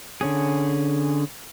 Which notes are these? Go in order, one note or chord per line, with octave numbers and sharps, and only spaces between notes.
D3 C#4 G#4